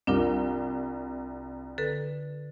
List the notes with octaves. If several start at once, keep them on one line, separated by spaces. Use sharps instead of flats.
C2 D4 F4 A#4
D3 A4 B4